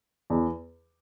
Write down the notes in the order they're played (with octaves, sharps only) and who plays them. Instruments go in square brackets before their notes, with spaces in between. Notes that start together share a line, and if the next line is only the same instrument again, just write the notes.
[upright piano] E2